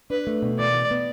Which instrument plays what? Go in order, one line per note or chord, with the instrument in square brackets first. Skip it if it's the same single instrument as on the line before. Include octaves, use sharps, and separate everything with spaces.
[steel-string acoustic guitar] D4 [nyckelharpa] B4
[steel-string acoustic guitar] A3
B2
[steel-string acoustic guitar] E3 [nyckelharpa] D5
[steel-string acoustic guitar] E3
B3